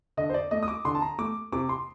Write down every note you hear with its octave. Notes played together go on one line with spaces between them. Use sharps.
D3 D#5
C5
D5
A3 D#5
D#6
D6
D3 C6
A5
A#5
A3 D6
C3 D6
C6